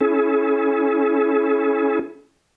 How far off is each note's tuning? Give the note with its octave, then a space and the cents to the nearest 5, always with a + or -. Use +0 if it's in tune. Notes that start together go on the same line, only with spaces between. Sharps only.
C#4 +0 E4 +0 A4 -45